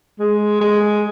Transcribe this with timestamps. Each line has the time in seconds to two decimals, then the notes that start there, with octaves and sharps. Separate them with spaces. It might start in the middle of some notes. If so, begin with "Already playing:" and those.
0.19 G#3
0.61 G#3